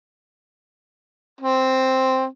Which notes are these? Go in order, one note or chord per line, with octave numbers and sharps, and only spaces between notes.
C4